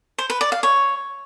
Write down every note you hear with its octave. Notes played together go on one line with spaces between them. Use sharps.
C5
B4
D5
F5
C#5